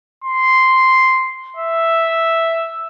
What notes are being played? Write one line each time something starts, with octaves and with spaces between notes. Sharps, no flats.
C6
E5